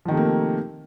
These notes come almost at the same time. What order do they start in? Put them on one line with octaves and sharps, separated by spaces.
F3 D#3 C3 A3 A#3